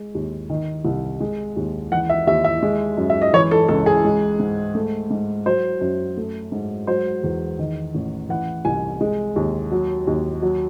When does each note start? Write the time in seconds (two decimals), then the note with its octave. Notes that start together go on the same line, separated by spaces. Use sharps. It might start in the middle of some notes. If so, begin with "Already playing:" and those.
Already playing: G#3
0.15 D#2
0.50 D#3
0.84 C2
1.20 G#3
1.56 D#2
1.91 E3 F#5
2.10 E5
2.27 D#2 E5
2.44 E5
2.63 G#3
2.98 F#2
3.10 E5
3.22 D#5
3.33 E3 C#5
3.51 A4
3.68 C#2 A4
3.86 G#4
4.04 G#3
4.40 G#2
4.75 A3
5.11 G#2
5.46 F#3 C5
5.81 F#2
6.17 A3
6.52 G#2
6.87 F#3 C5
7.23 E2
7.59 D#3
7.94 A1
8.29 E3 F#5
8.65 C2 G#5
9.01 G#3
9.36 D#2
9.71 F#3
10.07 D#2
10.42 F#3